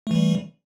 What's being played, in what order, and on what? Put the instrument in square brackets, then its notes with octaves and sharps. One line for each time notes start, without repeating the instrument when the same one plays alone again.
[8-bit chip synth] A3
E3
G3